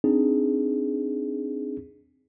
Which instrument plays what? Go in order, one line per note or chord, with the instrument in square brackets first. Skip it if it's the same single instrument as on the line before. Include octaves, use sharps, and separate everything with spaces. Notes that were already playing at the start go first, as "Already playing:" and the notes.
[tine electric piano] C4 D4 D#4 G#4